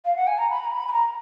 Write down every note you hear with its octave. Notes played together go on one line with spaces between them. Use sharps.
F5
F#5
G#5
A#5
B5
A#5
B5
B5
A#5